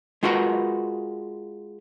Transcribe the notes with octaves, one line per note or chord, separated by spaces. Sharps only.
G#3 F4 F#4 A#4 B4